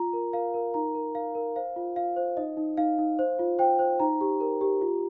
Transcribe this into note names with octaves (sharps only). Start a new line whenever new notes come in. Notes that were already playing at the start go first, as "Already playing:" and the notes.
Already playing: F4 A#5
A#4
A#4 F5
A#4
D#4 A#5
A#4
A#4 F5
A#4
C5 F5
F4
F4 F5
C5
D#4 D#5
D#4
D#4 F5
D#4
C5
F4
C5 G5
C5
D#4 A#5
G4
A#4
G4
F4